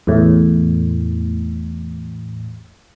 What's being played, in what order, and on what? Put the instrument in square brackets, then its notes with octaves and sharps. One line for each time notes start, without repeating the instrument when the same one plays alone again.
[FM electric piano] E2 A2